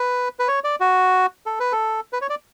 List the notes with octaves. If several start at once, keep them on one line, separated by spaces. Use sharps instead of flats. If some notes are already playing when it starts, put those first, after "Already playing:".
Already playing: B4
B4
C#5
D5
F#4
A4
B4
A4
B4
C#5
D5